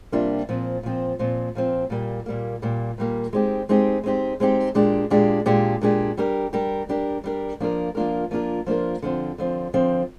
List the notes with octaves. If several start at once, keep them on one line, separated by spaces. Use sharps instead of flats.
C3 G3 A#3 D4 F4
A#2 F3 C4
A#2 F3 C4
A#2 F3 C4
A#2 F3 C4
A#2 G3 A#3
A#2 G3 A#3
A#2 G3 A#3
A#2 G3 A#3
G#3 C4 D#4 G4
G#3 C4 D#4 G4
G#3 C4 D#4 G4
G#3 C4 D#4 G4
A#2 G#3 D4 G4
A#2 G#3 D4 G4
A#2 G#3 D4 G4
A#2 G#3 D4 G4
G3 D4 G4 A#4
G3 D4 G4 A#4
G3 D4 G4 A#4
G3 D4 G4 A#4
F3 A#3 D4 F4 A#4
F3 A#3 D4 F4 A#4
F3 A#3 D4 F4 A#4
F3 A#3 D4 F4 A#4
D3 F3 C4
D3 F3 C4
D3 F3 C4